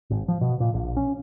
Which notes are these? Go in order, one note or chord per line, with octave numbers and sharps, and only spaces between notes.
G#1
F3
B2
A#2
A#1
C#4